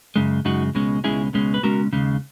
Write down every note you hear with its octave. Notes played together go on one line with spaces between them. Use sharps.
F#2 C#3 G#3
F#2 C#3 G#3 D#4 F#4
C#2 B2 G#3 C#4
C#2 B2 G#3 C#4 E4 G#4
C#2 B2 G#3 C#4
B4
C#2 B2 G#3 C#4 F#4 A#4
D#2 C#3 G#3